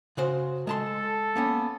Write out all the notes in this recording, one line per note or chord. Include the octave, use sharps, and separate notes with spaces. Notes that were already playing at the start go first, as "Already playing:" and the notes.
C#3 F#4 C5
G#3 A4 A5 C6
A#3 B3 C#4